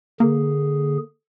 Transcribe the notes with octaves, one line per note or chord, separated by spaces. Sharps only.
D3 A#3 G#4